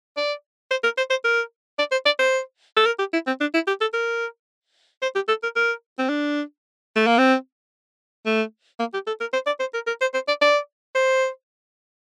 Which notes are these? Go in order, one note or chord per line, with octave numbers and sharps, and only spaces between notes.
D5
C5
A#4
C5
C5
A#4
D5
C5
D5
C5
A4
A#4
G4
E4
C4
D4
E4
G4
A4
A#4
C5
G4
A4
A#4
A#4
C4
D4
A3
A#3
C4
A3
A#3
G4
A4
A#4
C5
D5
C5
A#4
A#4
C5
C5
D5
D5
C5